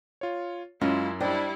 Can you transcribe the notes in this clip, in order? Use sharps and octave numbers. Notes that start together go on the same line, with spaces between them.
F4 C#5
F#2 G#3 C#4 E4 F4 D#5
G3 D4 E4 C5 D#5 G5